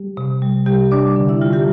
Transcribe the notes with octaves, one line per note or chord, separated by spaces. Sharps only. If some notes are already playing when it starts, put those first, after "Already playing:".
Already playing: G3 G4
C3
G3
C3 G3 G4
G3 D4 D5
D3
E4 E5
G3 F4
G3 G4